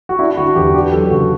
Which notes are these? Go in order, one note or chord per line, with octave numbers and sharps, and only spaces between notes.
F#4
D4 E4
D3 F#4
E2 G4
D4 G4
F#3 A4
C#3 F#4